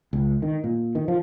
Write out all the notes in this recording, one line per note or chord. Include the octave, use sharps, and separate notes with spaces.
C#2
D#3
A#2
D#3
F3